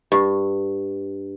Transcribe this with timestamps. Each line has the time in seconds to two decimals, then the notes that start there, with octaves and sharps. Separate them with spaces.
0.12 G2